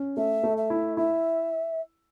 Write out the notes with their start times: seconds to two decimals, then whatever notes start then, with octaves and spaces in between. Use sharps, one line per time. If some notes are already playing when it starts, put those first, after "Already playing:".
Already playing: C#4
0.17 A3 E5
0.44 A3
0.57 E5
0.70 E4
0.97 E4 E5